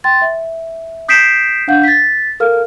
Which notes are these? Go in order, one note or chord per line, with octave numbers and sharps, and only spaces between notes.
G5 C6 A6
E5
D#6 G6 B6 C7 D7 E7
D4 F5 F#5 G6
A6 B6
A4 A#4 F5 F6